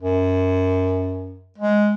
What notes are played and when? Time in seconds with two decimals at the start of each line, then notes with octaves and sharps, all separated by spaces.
0.02 F#2
1.58 G#3